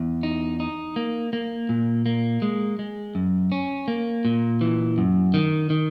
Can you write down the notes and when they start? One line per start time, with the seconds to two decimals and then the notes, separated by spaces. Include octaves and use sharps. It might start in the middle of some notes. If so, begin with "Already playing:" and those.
Already playing: E2
0.23 D#4
0.60 D#4
0.96 A#3
1.33 A#3
1.69 A#2
2.06 A#3
2.42 G#3
2.79 G#3
3.15 F#2
3.52 C#4
3.88 A#3
4.25 A#2
4.61 E3
4.98 F#2
5.34 D#3
5.70 D#3